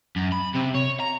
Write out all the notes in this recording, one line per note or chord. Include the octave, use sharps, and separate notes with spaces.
F#2
B5
C3
C#5
A#5